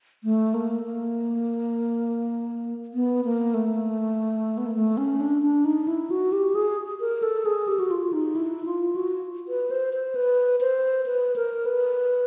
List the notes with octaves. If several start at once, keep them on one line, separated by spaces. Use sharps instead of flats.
A3
A#3
A#3
B3
A#3
A3
B3
A#3
A3
C#4
D4
D4
D#4
E4
F#4
G4
G#4
A#4
A4
G#4
G4
F#4
F4
D#4
E4
F4
F#4
B4
C5
C5
B4
C5
B4
A#4
B4